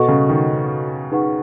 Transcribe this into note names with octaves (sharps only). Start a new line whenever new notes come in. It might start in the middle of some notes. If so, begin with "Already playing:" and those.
Already playing: B2 F#4 A4 D#5 F#5 C#6
C#3
D#3
D#4 G#4 B4 F#5 C#6